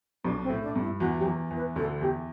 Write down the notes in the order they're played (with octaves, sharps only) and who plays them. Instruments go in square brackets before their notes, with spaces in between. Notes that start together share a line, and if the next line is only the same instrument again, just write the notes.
[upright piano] B1 B2 [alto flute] D4
[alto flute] C4
[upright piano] A2
[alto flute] D4
[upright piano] G2
[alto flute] E4
[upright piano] E2 E3 [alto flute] F#4
[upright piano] F#3 [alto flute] G4
[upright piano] E2 E3
E2 E3
[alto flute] B4
[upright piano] D2 D3 [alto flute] A4
[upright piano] E2 E3 [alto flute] G4